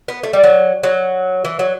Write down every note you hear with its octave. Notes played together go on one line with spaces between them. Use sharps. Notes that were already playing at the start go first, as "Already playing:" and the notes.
B3
A3
G3
F#3
F#3
E3
F#3